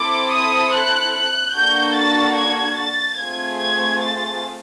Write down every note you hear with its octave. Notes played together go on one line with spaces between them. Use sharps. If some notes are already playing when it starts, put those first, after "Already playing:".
Already playing: C4 E4 A4 D6
D#6
F#6
F#6
A#3 D4 F#4 A4 G6
A6
G#6
A6
A3 C4 F4 G#4 G#6
G#6
A6